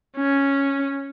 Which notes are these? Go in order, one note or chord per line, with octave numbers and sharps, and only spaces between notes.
C#4